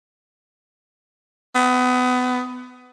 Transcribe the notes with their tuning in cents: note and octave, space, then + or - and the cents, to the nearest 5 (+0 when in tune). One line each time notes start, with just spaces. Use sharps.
B3 +25